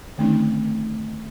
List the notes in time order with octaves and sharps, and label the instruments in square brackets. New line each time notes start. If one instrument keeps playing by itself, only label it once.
[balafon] D3 D#3 A3 C4 C#4 D#4